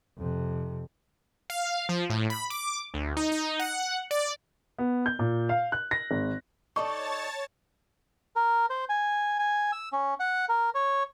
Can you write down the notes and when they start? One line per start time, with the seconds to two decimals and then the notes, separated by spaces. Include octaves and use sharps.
0.18 F2 C3
1.50 F5
1.89 F3
2.10 A2
2.30 B5
2.50 D6
2.94 D2
3.17 D#4
3.32 D#4
3.59 F#5
4.11 D5
4.78 B3
5.06 G6
5.19 A#2
5.49 F5
5.72 F#6
5.91 A#6
6.11 G#1
6.76 D#4 A4 C#5 D5 A5 C#6 A6
8.36 A#4
8.70 C5
8.89 G#5
9.39 G#5
9.72 E6
9.93 C#4
10.20 F#5
10.49 A#4
10.75 C#5